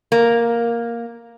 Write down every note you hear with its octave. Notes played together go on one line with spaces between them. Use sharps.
A#3